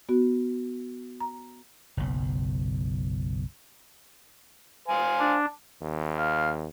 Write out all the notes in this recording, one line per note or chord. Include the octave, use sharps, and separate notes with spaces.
B3 F#4
A#5
F#1 B1
C5 F5 G#5
D4
D#2
F5